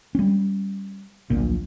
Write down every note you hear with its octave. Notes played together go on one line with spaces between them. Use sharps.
G3 C#4
D1 A#1 A#2